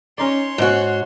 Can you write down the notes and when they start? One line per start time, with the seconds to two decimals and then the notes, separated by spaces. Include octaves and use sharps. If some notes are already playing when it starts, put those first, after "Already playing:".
0.18 C#4 D#4 C#5 D5 C6
0.58 G#2 F#4